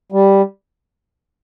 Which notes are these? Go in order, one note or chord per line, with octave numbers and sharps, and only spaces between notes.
G3